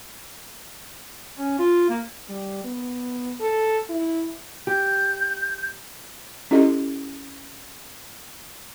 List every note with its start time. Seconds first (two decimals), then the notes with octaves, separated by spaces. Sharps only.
1.39 C#4
1.59 F4
1.90 A#3
2.29 G3
2.64 B3
3.40 A4
3.89 E4
4.67 G4 G6
6.51 C#4 E4 G4 A4 D#5